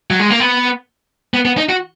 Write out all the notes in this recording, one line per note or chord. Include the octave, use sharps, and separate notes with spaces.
F#3
G#3
A#3
B3
B3
B3
D#4
F#4